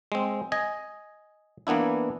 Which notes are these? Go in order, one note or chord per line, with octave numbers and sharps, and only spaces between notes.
G#3 C4
D#5 G#5
E3 A#3 B3 D4 E4